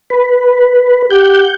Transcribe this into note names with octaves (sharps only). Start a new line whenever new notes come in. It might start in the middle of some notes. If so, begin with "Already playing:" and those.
B4
G4 F#5 G6